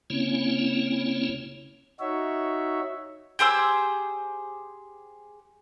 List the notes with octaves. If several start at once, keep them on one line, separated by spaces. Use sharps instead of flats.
C#3 A#3 C4 C#4 E4 C#5
D#4 F#4 C#5 E5
G4 G#4 C5 E6